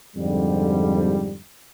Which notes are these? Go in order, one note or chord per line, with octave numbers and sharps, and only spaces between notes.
F2 G#2 D3 G3